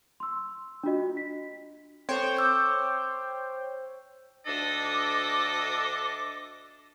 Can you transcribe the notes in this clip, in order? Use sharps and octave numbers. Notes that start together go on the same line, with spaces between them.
C6 E6
D4 F4 F#4 D#5
B6
C4 A4 C5 C#5 G5
D6 E6 G6
D2 D4 A4 D#5 D6